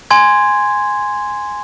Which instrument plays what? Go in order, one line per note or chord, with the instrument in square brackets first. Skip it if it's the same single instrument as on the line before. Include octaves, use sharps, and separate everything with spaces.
[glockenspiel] G#5 C6 G#6